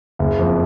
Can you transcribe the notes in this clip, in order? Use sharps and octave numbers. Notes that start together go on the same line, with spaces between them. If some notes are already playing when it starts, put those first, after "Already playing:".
F#1
F2